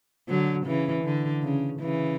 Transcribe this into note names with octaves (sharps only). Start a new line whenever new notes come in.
D3 F#3
C#3 E3
D3
C#3
C#3 E3